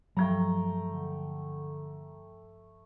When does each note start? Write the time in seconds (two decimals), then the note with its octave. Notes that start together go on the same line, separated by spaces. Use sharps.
0.17 G2 F3 F#3 A3 G5 A#5
0.85 D3